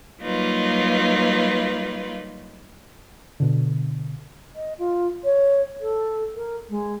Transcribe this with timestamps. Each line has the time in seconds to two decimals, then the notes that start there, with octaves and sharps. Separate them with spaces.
0.21 F#3 G3 A#3 D#4 F4 B4
3.40 B2 D3
4.55 D#5
4.78 F4
5.24 C#5
5.81 A4
6.35 A#4
6.69 G#3